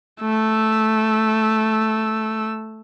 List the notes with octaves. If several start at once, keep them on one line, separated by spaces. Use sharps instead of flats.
A3 E6